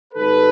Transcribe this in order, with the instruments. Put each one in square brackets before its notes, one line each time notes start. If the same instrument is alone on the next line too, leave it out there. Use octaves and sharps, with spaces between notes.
[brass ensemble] G#1 G#2 D#3 G3 A4 B4